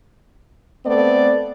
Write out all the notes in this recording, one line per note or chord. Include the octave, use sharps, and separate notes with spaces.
A3 B3 C4 D5